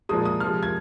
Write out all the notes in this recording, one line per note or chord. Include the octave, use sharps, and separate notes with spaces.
A#2 F3 G#3 D#6
D#6
C3 F3 G#3 F6
G#6